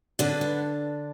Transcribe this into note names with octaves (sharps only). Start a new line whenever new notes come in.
D3 B3 D4
B3